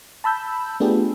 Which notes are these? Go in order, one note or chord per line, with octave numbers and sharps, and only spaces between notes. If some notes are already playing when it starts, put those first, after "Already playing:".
A5 B5 E6 G6
A3 B3 D4 F4 G4 G#4